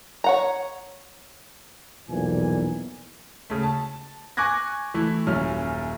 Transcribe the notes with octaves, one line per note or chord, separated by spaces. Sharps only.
C#5 F#5 A#5
B1 E2 A#2 E3 F3 G#5
C#3 A3
A5
G#5 C#6 D6 F#6 G#6 A#6
E3 A3 E4
D#1 F#2 C#4 F6